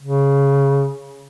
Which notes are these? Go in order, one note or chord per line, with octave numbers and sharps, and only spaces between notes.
C#3